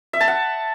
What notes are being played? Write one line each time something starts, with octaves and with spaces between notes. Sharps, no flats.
E5
A5
F#5